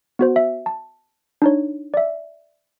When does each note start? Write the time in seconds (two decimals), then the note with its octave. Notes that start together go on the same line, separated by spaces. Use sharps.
0.19 B3 F#4 C5
0.36 E5
0.66 A5
1.42 D4 D#4 C#5
1.94 D5 E5